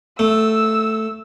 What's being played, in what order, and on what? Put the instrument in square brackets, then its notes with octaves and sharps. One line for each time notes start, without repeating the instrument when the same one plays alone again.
[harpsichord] A3 [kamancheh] E6